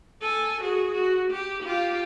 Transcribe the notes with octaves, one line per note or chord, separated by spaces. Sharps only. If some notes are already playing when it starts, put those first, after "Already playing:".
A4 G#5
F#4 G#4
F#4
G4
F4 G4